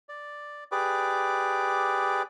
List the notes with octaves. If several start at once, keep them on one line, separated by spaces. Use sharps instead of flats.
D5
G4 G#4 B4 D5 D6